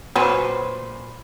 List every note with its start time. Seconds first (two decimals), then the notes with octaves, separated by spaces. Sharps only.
0.16 A#2 F#3 C#4 B4 C5